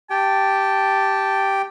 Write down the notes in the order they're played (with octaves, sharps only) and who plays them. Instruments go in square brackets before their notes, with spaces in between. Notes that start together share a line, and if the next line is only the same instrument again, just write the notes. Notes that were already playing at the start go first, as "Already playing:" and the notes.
[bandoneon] G4 G5 [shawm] A5